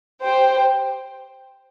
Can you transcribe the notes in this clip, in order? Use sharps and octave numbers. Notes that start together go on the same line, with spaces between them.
G4 C5 G5